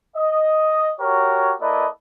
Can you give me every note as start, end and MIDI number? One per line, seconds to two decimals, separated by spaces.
0.17 0.92 75
1.00 1.53 66
1.00 1.53 67
1.00 1.53 70
1.00 1.53 73
1.61 1.87 58
1.61 1.87 64
1.61 1.87 69
1.61 1.87 71
1.61 1.87 74
1.61 1.87 75